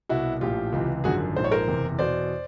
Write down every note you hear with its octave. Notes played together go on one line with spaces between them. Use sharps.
C2 B2 E4 F#4
A#1 A2 F3 F4 G4
C#2 C3 E3
G#1 F#2 D3 F3 F#4 G#4
A#1 G#2 F3 C5
C#5
A#4 C5
F#1 E2 C3
E2 B2 C5 D5